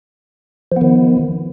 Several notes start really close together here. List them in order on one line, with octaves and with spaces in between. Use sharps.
F3 B3 D#3